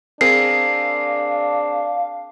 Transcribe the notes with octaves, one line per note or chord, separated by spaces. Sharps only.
C4 D4 G#4 A#4 F5 C7